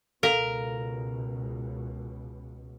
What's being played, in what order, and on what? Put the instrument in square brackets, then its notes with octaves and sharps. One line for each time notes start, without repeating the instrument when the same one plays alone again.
[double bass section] C#2 B2 [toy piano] A4 F5 [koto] A#4